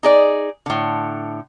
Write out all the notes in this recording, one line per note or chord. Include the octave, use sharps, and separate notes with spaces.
D#4 G#4 D5
A2 D3